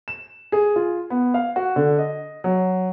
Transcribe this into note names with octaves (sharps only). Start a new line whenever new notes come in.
E7
G#4
F4
B3
F5
F#4
D3
D#5
F#3